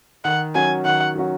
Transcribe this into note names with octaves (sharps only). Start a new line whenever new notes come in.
D#3 F#5
F#3 C#4 F#4 G#5
D#3 F#5
F#3 C#4 F#4